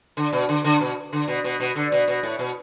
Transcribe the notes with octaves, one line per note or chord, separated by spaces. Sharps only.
D3
B2
D3
D3
B2
D3
B2
B2
B2
D3
B2
B2
A2
B2